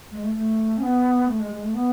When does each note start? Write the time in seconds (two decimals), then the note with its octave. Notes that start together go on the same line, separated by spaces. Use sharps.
0.12 G#3
0.24 A3
0.35 A3
0.78 C#4
0.82 B3
1.28 A3
1.40 G#3
1.51 G#3
1.63 A3
1.74 B3